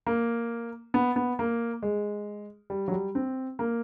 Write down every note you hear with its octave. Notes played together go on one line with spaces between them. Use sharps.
A#3
B3
B3
A#3
G#3
G3
F#3
G3
C4
A#3